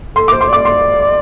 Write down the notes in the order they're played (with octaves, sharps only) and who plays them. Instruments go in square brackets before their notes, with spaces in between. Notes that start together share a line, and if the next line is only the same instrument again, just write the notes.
[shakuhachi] A4 [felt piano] C6
[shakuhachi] C5 [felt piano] D6
[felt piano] C6
[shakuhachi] D5 [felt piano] D6
[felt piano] C6